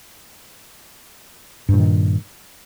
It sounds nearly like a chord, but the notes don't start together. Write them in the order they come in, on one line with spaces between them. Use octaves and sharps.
G2 A#2 D#3